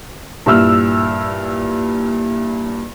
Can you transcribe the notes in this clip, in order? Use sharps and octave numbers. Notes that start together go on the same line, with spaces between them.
G2 A#2 E4 E6 F6